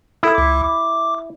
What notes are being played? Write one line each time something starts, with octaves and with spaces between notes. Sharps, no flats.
E4 A4 D#6
C#2 D6
D6